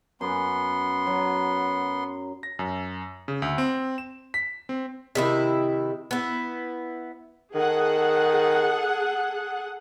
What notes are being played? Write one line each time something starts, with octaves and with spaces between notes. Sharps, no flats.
F#2 B3 C6
F#3
A#6
F#2
C#3
D2
C4
E7
B6
C4
C3 D#3 E4
B3 E4
D#3 G#4 A4 F#5